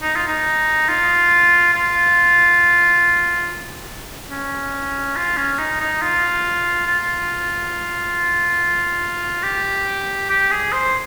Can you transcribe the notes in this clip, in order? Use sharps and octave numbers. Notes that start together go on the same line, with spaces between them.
D#4
F4
D#4
F4
F4
C#4
F4
C#4
D#4
D#4
F4
F4
G4
G4
G#4
C5